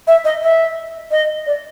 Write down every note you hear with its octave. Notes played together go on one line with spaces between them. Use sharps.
E5
D#5
E5
D#5
D5